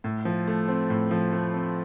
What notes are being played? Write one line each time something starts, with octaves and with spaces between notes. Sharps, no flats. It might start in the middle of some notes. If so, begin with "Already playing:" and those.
A2
F3
A3
C4
A2
F3
A3
C4